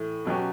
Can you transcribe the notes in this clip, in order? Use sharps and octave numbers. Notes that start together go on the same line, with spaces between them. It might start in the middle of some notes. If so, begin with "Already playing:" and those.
Already playing: A2 E3 A3
B2 F#3 C#4 G4